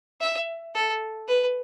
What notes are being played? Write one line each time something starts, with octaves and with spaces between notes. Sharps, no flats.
E5
A4
B4